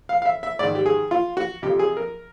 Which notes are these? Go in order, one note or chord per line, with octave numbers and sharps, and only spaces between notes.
F5
F5
E5
E5
G#2 D#3 D5
G4
G#4
F4
F#4
F2 C3 F3 G4
G#4
A#4